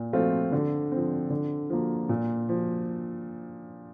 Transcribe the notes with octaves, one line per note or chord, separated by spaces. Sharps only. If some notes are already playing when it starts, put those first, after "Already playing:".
Already playing: A#2
F3 A3 C4 F4
D3
F3 C4
D3
F3 A#3
A#2
F3